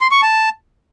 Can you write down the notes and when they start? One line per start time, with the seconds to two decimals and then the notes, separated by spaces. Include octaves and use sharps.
0.01 C6
0.11 C#6
0.22 A5